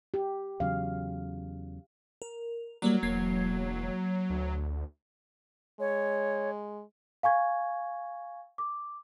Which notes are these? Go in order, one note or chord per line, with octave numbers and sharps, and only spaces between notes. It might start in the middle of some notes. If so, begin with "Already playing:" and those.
G4
E2 C#3 F#3 F5
A#4
F#3 G3 A#3 D5
E1 A#3 G#6 C7
D2
G#3 C#5
F5 G#5 C#6 G#6
D6